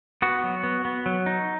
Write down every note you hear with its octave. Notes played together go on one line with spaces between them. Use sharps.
B3 F#4
F#3
B3
B3
F#3
D#4